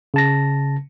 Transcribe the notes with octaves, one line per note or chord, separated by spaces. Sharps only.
C#3 A5 A#6